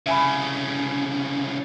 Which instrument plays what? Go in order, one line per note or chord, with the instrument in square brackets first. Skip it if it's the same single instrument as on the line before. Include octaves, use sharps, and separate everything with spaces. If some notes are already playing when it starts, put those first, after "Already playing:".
[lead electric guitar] C2 C#3 [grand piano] E5 G#5 B5